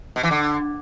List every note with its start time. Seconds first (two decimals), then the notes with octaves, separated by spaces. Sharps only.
0.16 B2
0.23 E3
0.31 D3